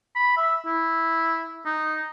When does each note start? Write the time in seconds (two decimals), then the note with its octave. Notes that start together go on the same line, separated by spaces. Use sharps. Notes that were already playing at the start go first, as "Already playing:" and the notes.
0.15 B5
0.37 E5
0.65 E4
1.66 D#4